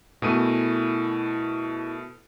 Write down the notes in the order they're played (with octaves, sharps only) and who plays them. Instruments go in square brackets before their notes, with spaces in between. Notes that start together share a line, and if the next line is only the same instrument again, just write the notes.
[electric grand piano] B2 A3 D#7 [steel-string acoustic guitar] E4 A#4 G#5